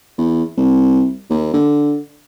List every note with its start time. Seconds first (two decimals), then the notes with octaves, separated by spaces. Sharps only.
0.18 E2
0.57 C2
1.30 D#2
1.54 D3